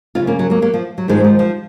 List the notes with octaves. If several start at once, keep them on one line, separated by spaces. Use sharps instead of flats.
F#2 C#3 C#4 F4
A#3 C#4
F#3
F#3 A#3
F#3 A#3
F3
F#3
G#2 D#3 F3 G#3
F3
F3